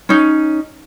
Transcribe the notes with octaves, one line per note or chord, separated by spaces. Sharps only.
C#4 D#4